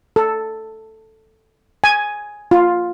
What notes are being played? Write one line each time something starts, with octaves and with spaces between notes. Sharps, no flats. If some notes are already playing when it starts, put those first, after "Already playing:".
A4
G#5
F4